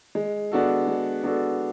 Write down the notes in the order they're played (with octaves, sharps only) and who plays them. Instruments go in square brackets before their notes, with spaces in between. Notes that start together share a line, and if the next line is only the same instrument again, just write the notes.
[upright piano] G#3
B3 D4 F#4 A4
G#3
B3 D4 F#4 A4